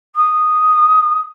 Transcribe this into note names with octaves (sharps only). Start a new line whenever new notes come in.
D#6